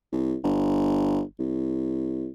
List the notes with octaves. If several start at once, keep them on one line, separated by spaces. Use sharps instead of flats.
C2
G1
C2